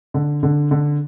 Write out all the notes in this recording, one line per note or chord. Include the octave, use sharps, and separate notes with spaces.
D3
D3
D3